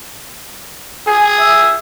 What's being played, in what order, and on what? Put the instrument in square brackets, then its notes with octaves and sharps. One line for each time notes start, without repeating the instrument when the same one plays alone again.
[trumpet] G#4 [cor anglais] G#5
[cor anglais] E5